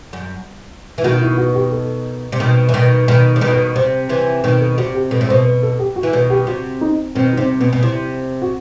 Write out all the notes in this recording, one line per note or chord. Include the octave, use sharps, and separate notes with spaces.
F#2
E3
B2 D#3 F#4
E4
F#4
G4
A4
C3
B2 D#3
E3
B2 D#3
B2 D#3 B4
C3
B2 D#3
B4
C3 C5
C3 E3
B2 D#3 B4
A4
C3 F#4
G4
B2 A4
A2
B2 C5
B4
A4
G4
F#4
E3
B2 D#3 B4
G4
C3 F#4
D#4
B2 D#3 C4
D#4
C3 C4
B2 B3
B2
C3 E4
F#4